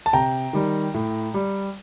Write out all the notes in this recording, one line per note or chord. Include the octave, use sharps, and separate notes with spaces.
A5
C3 G5 A#5
D#3 G3
A2
G3